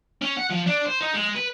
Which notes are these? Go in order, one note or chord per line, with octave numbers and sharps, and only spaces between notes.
C#4
F#5
F3
D4
C5
D#4
G#3
B4